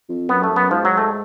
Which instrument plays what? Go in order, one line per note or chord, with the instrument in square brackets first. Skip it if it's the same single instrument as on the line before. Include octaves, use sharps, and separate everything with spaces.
[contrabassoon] F2
[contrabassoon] F#2 [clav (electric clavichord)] B3
[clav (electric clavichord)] A3
[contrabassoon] F#2
[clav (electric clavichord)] B3
[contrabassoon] G#2 [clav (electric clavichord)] F3
[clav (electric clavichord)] F#3
A3